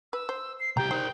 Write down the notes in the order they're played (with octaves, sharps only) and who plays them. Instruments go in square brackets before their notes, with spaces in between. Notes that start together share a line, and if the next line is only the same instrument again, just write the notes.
[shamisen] B4 [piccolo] E6
[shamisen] C5
[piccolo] C7
[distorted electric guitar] C2 G4 [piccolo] G5 [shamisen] A#5
[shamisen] D#4 [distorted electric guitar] A#4 C5